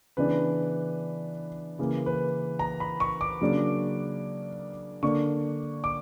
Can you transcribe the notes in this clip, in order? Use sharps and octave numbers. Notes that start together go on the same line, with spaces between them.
C#3 E3 B3 D4 B4
C#3 E3 A#3
B4
A#5
B5
C#6
D6
C#3 F#3 A#3 D4
D3 A#3 D4 C#6
D6